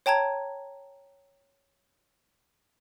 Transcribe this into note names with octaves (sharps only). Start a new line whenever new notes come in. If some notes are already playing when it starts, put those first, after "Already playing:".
C#5 G5 A5 A#5 G#6